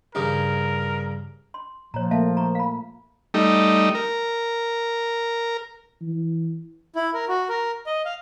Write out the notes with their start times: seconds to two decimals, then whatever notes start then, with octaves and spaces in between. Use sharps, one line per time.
0.15 G2 C#3 A#4
1.54 C6
1.94 A#2 F3 C#5 A#5
2.11 A3 A#3 E5 F5 A5
2.37 A#5 C#6
2.55 F5 B5
3.34 G3 A3 D#4
3.95 A#4
6.02 E3
6.95 E4
7.14 A#4
7.28 F#4
7.49 A#4
7.86 D#5
8.05 F5